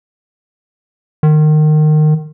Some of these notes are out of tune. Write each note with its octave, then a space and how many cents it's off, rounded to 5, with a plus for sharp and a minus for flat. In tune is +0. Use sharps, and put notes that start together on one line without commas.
D#3 -25